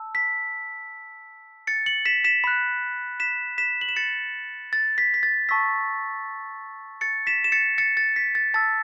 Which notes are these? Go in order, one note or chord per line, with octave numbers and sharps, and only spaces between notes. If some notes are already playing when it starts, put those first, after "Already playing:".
Already playing: A5 E6
B6
A6 C#7
C#7 F#7
B6 E7
B6 E7
B5 F#6
B6 E7
B6 E7
F#7
E7
A6 C#7
A6
B6
B6
A6
A5 C#6 E6 B6
A6 C#7
B6 E7
E7
A6 C#7
A6 C#7
A6
B6
A6
A5 E6 A6